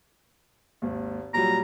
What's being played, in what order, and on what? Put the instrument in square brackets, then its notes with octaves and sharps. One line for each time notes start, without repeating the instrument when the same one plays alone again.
[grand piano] G#1 D#2
[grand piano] A#2 F#3 G3 [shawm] A#5